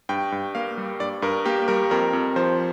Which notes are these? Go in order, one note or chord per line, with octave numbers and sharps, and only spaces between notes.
G2 G5
G2
A#3 F5
G3
G2 D5
G2 A#4
A#3 G4
G3 A#4
F2 A#4
F2
F3 C5